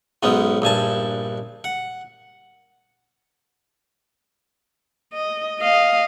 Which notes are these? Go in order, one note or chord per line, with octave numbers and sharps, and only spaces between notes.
B1 G#2 G#3 B3 C#4
A#1 G2 G#5 A5
F#5
D#5
D#5 F5